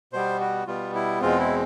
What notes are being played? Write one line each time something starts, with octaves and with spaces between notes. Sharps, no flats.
B2 G3 B3 C5
F#4
B2 G3 B3 F4
E4
E2 B2 G#3 C4 F4
E4